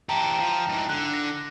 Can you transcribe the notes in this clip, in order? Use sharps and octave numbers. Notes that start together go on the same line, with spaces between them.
E3 G4 G5 A5 A#5
F3
G#2 E3
D3 F#6
A#6